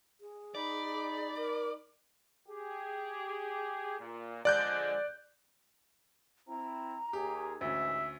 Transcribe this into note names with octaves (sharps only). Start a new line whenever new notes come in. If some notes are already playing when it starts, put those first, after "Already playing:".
G#4
D#4 D5 B5
A#4
G4 G#4
A#2
D3 F3 G#3 D5 F#6 G6
C4 E4 A#5
D#2 G4 G#4
A1 D2 G#2 C#4 E5